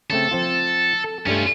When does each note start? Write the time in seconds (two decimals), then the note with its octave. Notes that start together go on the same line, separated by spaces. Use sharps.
0.10 C#3 A3 C4 A4
0.31 F3 C4 F4
1.04 A4
1.26 G2 G3 A3 C#4 F4